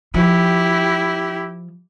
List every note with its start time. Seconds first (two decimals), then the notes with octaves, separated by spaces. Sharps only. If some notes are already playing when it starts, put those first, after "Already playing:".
0.14 F3 E4 G4